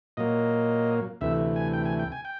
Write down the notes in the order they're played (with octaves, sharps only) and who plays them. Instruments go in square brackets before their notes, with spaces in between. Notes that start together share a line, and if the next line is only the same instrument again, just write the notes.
[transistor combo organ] A#2 F#3 A#3 D#5
D2 C3 E3 A3 E5
G#5
G5
G#5
G5
G#5
G5